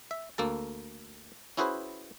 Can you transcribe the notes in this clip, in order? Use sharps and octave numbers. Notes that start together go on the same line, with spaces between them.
E5
D2 A#3 A4 A5
C#4 E4 F#4 G#4 B4 C5